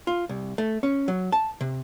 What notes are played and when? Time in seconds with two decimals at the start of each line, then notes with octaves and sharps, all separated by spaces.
0.07 F4
0.29 C2
0.58 A3
0.83 C#4
1.08 F#3
1.32 A5
1.61 C3